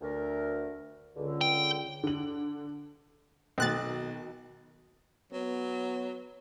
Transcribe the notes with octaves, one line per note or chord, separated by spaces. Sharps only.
D2 A3 A#4
C#2 D3
G5
D3 F#7
B1 B2 D#3 C4 F#6 A6
F#3 B3